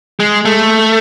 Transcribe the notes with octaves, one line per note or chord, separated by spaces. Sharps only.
G#3
A3